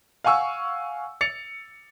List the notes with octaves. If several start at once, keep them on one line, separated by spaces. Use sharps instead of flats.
F5 F#5 G#5 C#6 E6
A6 C#7 F7